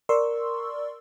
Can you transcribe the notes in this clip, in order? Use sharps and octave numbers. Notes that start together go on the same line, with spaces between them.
A#4 D5 C6 C#6 E6